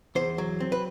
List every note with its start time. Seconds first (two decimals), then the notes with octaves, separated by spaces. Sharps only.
0.15 E2 C5
0.38 F#3
0.60 C4
0.72 B4